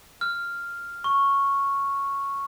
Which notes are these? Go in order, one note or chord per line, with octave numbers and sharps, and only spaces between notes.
F6
C#6